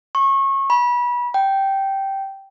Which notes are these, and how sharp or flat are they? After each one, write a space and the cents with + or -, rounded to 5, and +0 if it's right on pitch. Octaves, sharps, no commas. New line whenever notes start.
C#6 -25
B5 -25
G5 -10